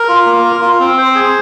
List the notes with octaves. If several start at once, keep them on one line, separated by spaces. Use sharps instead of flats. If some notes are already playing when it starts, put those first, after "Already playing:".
Already playing: A#4
F4
A#3
A#4
F4
C4
C5
G#4